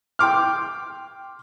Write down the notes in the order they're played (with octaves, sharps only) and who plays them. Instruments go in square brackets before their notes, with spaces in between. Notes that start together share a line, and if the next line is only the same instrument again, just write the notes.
[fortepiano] G5 C6 D6 F6